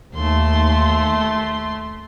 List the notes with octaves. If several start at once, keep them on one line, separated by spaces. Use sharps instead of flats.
D#2 A3 C6